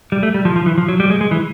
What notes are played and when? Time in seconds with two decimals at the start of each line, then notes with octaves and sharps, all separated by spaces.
0.12 G3
0.23 A3
0.34 G3
0.45 F3
0.56 F3
0.66 E3
0.78 F3
0.88 F#3
1.00 G3
1.10 G#3
1.21 G#3
1.31 E3